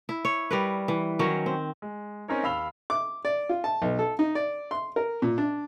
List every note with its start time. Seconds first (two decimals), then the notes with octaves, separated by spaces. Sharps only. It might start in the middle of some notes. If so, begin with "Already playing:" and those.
0.09 E4
0.25 C#5
0.51 G3 A#4 B4
0.88 E3
1.19 D#3 F#3 C#4
1.46 C4
1.82 G#3
2.28 C4 C#4 D#4 A#4 C#5
2.43 D#2 F5 B5 E6 F7 G7
2.90 D6
3.25 D5
3.49 F4
3.64 A5
3.82 B1
3.99 A4
4.19 D#4
4.35 D5
4.71 C6
4.96 A#4
5.22 A#2
5.38 D4